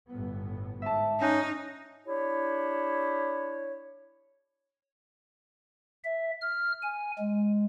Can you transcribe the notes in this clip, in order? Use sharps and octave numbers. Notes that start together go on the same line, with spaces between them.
G1 A2 B3
G#2 E5 A5
C#4 D#4 F#6 G6 A#6
D4 E4 G4 C#5
E5
F6
G#5
G#3